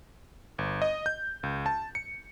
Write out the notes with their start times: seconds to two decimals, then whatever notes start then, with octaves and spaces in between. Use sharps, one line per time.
0.58 G1
0.82 D#5
1.06 G6
1.43 C#2
1.66 A5
1.95 C#7